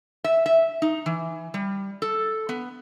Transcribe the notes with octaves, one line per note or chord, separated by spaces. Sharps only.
E5
E5
D#4
E3
G3
A4
B3